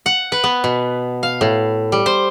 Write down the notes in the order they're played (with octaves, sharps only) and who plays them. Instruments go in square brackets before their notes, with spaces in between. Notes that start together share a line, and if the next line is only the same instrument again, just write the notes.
[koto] F#5
B4
B3
B2
F5
A2
G3
C5